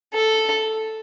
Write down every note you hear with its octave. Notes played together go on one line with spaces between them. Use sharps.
A4